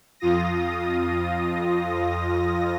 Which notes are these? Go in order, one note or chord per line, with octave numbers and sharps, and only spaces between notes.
F2 F4 D#6 A#6